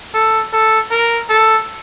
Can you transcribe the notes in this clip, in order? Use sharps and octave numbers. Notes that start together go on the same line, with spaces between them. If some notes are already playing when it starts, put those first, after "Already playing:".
A4
A4
A#4
A4